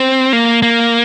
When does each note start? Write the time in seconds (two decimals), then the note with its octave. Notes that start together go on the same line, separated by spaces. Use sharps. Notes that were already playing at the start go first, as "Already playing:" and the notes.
Already playing: C4
0.33 A#3
0.62 A#3